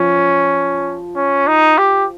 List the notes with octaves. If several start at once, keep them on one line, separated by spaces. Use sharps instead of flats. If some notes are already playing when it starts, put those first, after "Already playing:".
Already playing: F3 C#4
C#4
D#4
G4